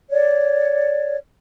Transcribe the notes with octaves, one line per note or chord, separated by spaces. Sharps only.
C#5 D5